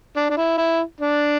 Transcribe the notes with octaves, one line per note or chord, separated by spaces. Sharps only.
D4
D4
E4
E4
D4